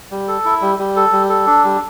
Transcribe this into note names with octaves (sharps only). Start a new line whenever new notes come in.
G3
A4
E4
G3
G3
A4
G3
A4
D4
G3